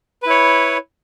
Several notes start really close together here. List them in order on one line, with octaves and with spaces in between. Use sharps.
B4 E4 C#5